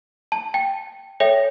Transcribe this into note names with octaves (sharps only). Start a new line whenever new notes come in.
A5
G5
A4 C#5 E5 G5